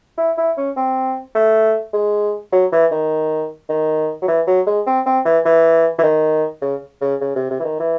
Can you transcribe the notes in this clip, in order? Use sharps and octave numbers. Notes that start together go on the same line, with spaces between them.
E4
E4
C#4
C4
A3
G#3
F#3
E3
D#3
D#3
F#3
E3
F#3
G#3
C4
C4
E3
E3
E3
D#3
C#3
C#3
C#3
C3
C3
E3
D#3
E3